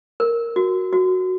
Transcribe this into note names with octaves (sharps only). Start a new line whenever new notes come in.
A#4
F#4
F#4